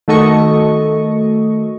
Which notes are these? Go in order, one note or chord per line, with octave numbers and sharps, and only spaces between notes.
D#3 A3 F#4 A4 D#5 C#6